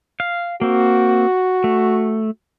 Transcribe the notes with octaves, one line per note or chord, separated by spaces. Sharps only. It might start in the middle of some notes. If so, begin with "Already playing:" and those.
F5
A#3 C4 F#4
A3